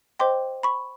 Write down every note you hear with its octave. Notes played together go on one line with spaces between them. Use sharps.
C5 D#5 G5 C6 D6
B5 C#6